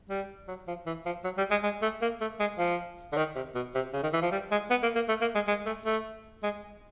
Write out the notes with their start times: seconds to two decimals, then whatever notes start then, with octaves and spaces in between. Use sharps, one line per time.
0.10 G3
0.48 F#3
0.68 F3
0.86 E3
1.06 F3
1.24 F#3
1.38 G3
1.51 G#3
1.63 G#3
1.82 A3
2.02 A#3
2.21 A3
2.40 G#3
2.59 F3
3.12 D3
3.17 D#3
3.36 C3
3.55 B2
3.75 C3
3.93 C#3
4.03 D#3
4.13 E3
4.22 F3
4.32 G3
4.51 G#3
4.70 B3
4.83 A#3
4.95 A#3
5.09 A3
5.22 A#3
5.35 G#3
5.48 G#3
5.66 A3
5.86 A3
6.43 G#3